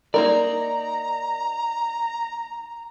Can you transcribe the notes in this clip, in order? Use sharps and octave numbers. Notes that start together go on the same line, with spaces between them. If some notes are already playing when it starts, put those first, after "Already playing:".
A#3 D#4 A#4 D5 A#5